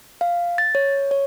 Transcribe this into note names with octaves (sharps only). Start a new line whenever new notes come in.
F5
A6
C#5
C#5